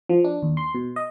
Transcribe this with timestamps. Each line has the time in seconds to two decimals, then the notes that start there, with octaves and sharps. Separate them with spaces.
0.09 F3
0.24 D4
0.43 D#2
0.57 C6
0.75 B2
0.96 D#5